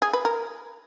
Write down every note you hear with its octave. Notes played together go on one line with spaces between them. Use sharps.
G#4
B4
A#4